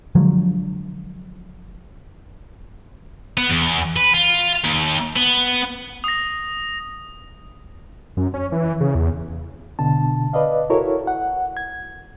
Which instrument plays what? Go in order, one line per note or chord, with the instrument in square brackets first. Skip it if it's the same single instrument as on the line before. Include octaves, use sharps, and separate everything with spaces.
[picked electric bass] D3 F3 F#3 G#3
[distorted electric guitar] B3
E2
B4
F4
D#2
B3
[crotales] D#6 A#6
[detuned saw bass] F#2
C#4
E3
C#3
E2
[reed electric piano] B2 D3 A5
B4 D5 D#5 F5
E4 F#4 A4 A#4 C#5
F#5
G#6